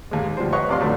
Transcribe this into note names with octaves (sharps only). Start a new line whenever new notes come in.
D#2 G#3
G#3
D2 F3 G3 C5
B4 C#5 D#5 F#5 B5 C#6
A1 C3 D5 F5 C6
A#1 F#2 D3 A3 D4